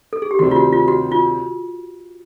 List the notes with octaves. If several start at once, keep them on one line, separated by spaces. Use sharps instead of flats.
A4
G#4
G4
D2 C3 D#3 G3 C4 F#4
F4
F#4
F4
F#4
F4